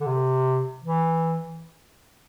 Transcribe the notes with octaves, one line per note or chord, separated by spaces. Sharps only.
D3
C3
E3